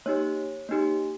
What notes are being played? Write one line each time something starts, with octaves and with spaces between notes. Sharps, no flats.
A#3 D#4 G4 C#5
A#3 D#4 G4